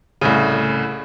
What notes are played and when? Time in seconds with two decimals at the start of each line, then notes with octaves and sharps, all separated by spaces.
0.21 C2 A2 C#3